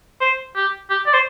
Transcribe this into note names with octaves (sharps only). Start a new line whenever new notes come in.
C5
G4
G4
D5
C5